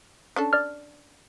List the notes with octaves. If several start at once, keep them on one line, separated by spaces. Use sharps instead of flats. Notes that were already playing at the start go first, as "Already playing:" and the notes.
C#4 D4 A4
D5 F6